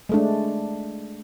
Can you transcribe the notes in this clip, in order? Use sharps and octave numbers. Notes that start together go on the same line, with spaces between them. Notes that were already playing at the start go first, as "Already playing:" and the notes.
G#3 A3 D4